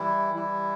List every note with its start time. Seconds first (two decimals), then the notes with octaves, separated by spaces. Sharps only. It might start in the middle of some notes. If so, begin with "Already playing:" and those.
Already playing: E3 G3 E4
0.33 E3 G3 E4